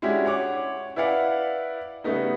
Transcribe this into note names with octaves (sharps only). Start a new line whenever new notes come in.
G#3 C#4 D4 E4 F#4 G4
C#5 F#5 D6
E4 B4 D5 F5 F#5
C#3 G3 A3 B3 D#4